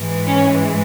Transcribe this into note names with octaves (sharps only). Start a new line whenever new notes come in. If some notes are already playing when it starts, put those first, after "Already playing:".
Already playing: G#2 E3 G#3
C#4